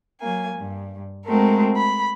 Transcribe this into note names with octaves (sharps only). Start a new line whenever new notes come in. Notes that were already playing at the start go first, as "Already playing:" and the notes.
F#3 A#3 G#5
G2
G#3 A3 C4 F#4 A4 A#4
B5